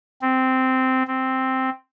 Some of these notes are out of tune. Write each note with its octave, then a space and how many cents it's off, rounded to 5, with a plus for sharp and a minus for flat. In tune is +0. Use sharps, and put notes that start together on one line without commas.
C4 -10
C4 +0